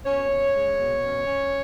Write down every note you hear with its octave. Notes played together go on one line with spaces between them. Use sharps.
B2 C#4 C#5
C#4
G#3
B2
C#4
C#4